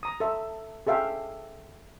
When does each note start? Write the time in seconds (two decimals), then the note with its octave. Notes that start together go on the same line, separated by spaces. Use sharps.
0.03 A#5 D#6
0.20 A4 E5
0.87 G#4 A4 E5 F5 G5